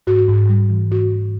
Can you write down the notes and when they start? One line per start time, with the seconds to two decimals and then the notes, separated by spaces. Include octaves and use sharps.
0.07 G#2 F#4
0.28 G#2
0.49 G3
0.70 E3
0.91 G#2 F#4
1.12 G#2